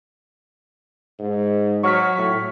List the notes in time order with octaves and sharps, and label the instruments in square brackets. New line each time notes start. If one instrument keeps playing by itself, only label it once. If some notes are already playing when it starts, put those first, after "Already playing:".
[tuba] G#2
[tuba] F#3 [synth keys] C#6 F6 B6
[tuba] A2